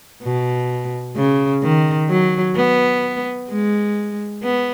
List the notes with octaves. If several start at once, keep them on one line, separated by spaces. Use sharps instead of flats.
B2
C#3
D#3
F#3
B3
G#3
B3